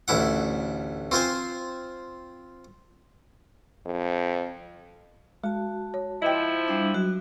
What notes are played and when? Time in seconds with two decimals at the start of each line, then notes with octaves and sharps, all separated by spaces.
0.08 A1 D2 E4 F#5
1.11 C4 F4 C5 G#5
3.86 F2
5.44 G#3 F#4 A5
5.94 C#5
6.22 F3 E4 D#5 G5
6.68 G3 D4
6.94 F#3 F#4